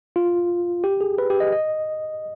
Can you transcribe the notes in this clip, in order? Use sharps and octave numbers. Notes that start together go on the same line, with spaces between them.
F4
G4
G#4
B4
G4
D#5
D#5